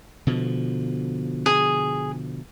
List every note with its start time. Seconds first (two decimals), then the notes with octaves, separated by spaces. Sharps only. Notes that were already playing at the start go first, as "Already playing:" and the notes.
0.27 B2 D3 F3
1.46 G#4